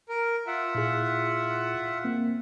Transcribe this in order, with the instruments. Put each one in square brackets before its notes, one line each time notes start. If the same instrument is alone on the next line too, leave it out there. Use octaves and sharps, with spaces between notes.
[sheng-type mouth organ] A#4
F4 E5 F#5
[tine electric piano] A#2 E4 G#4
A#3 C4